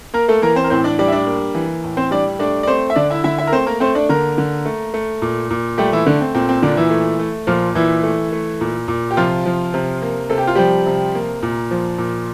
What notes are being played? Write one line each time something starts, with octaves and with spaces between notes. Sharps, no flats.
A#3 A#4
A3 A4
E3 A#3 A#4
C4 C5
A#4
A2 C4 C5
D4 D5
G3 D4 D5
E5
D4 D5
A#3
E3
A2
C4 C5
G3 D4 D5
A3 D4 D5
D5
A3 C4 C5
E5
D3 D4 D5
E4 E5
D3 E4 E5
E4 E5
A#4
A3 C4 C5
A#3 A#4
A3 C4 C5
D4 D5
D3 A#3 A#4
D3
A3
A3
A#2
A#2
G3 A3 G4
E3 E4
D3 A3 D4
C4
A#2 C4
C4
A#2 D3 D4
E3 E4
A3
A3
A#2 F3 F4
A#2 E3 E4
A3
A3
A#2
A#2
G4
C3 F3 F4
F3
C3
A#3
C3 A4
G4
F4
F3 G3 G4
C3
A#3
A#2
F3
A#2